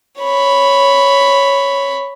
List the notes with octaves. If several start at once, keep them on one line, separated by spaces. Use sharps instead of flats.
C#5 B5